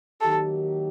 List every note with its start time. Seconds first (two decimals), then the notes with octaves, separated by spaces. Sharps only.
0.21 D#3 F#3 A#3 D#4 G4 A4